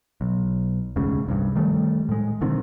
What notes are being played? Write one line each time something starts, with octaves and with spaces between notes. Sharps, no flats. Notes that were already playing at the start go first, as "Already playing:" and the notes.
B1
E1 D2 G#2 C#3
C2 G2
D#3 G3 A3
A2 G#3
B1 D3 D#3 C4